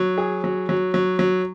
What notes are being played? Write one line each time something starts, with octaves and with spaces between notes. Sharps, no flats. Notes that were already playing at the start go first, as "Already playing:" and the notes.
Already playing: F#3
G#4
F#3
F#3
F#3
F#3